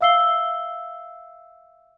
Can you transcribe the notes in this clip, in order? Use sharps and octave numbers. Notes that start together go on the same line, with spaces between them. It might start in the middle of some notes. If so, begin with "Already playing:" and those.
E5 F5 E6 C7 G7